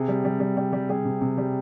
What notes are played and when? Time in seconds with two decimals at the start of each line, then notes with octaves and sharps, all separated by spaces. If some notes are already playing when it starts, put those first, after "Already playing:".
Already playing: C3 G#4
0.08 G3
0.25 G3
0.40 G3
0.57 G3
0.73 G3
0.89 G3 G#4
1.05 C3
1.21 C3
1.38 G3